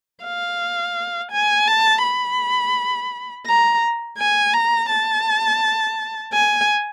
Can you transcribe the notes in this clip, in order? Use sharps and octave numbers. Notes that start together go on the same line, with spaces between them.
F5
G#5
A5
B5
A#5
G#5
A#5
A5
G#5